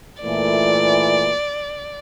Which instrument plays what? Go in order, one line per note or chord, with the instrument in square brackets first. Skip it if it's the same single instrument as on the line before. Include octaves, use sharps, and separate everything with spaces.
[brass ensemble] A#2 E3 A3 [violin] D5